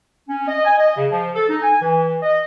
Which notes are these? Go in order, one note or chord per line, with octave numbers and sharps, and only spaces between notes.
C#4
D#5
G#5
D#5
C#3
F3
A4
D#4
G#5
E3
D#5